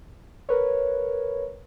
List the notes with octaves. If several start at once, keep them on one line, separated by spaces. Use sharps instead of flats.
A#4 B4 C#5